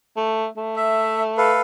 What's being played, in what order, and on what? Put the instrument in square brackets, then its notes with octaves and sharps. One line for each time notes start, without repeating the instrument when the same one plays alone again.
[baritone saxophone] A3
A3
[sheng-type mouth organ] E5
A4 B4 F5